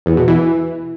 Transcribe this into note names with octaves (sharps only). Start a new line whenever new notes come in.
E2
B2
E3